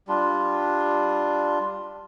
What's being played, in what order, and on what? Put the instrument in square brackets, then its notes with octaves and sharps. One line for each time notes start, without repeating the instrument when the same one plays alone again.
[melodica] G3 D4 F4